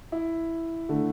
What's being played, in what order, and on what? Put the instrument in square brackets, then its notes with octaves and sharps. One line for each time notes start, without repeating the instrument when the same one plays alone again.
[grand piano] E4
D3 A3